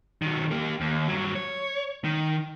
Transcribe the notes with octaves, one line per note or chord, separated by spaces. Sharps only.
D#3 F#3
A#3 G4
D#2
G2 F#3
C#5
D#3